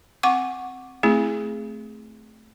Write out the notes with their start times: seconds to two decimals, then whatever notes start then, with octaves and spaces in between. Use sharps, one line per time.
0.23 C4 F#5 C#6 D6
1.03 A3 C4 E4 G#4